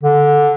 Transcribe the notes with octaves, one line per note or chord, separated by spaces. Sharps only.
D3